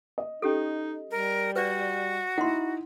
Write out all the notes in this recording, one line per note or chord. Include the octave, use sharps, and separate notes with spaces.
D#5
C#4 D#4 G4 A4
G3 A#4
F#4 B4 D5
D#4 E4 F#5 C6